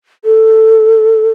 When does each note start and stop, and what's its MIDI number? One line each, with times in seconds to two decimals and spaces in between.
0.25 1.32 69